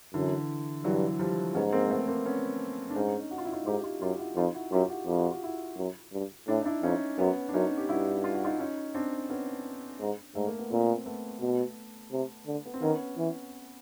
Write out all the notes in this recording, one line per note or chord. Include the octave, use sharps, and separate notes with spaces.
F#2 D3 E3
G2 E3 F#3
F3 G3
G#2 B3 C#4
A#3 C4
A3 B3
A#3 C4
B3 C#4
D4
G#2 C#4 D#4
F#4
F4
E4
D#4 F4
G#2 F4 G4
F4 G4
F#2 F4 G4
E4 F#4
F2 D#4 F4
E4 F#4
F#2 F4 G4
G4
E4 F#4
F2 G4
F#4
F4
E4 F#4
F#2
G2
A2 D4 E4
D#4
D4 E4
F2 C#4 D#4
F#2 B3 C#4
D4
F#2 C#4 D#4
G4
G2 E4 F#4
F4
F#4
D#4 F4
C#4 D#4
C4 D4
B3 C#4
G#2
G#2 A3
A#3
B3
A#2 A#3 C4
A3 B3
B2
C3
D3
B3
C4
D#3 B3 C#4
E3